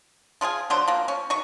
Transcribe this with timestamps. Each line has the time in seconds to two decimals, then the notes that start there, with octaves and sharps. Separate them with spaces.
0.41 F3 F4 G4 G#4
0.70 D3 F#3 C5
0.88 F3 A#3
1.08 C#4
1.30 B2 D#3 C#6